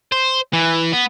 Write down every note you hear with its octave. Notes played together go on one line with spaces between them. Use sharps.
C5
E3
B3